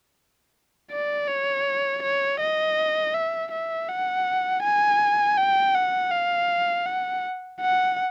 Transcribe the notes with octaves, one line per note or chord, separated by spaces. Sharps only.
D5
C#5
C#5
D#5
E5
E5
F#5
G#5
G5
F#5
F5
F#5
F#5